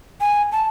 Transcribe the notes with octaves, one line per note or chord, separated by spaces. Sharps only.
G#5
A5